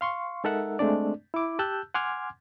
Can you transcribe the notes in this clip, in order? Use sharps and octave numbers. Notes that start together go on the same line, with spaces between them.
F5 C6 C#6
G#3 D#4 A4 A#4 E5 F#5
G#3 A3 C4 D4 D5
E4 D6
G4 A5 E6 F#6 G6
F#5 G#5 C6 D6 F6 G#6